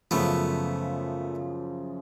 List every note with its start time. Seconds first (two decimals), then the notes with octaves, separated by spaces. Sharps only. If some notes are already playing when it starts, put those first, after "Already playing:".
0.11 F#2 C#3 F3 A3 B3